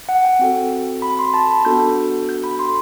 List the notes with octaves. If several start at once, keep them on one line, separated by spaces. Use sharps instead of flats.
F#5
G5
C4 F#4 A4
B5
C6
A5
B5
B3 D4 F#4 A4 G6
G6
B5
C6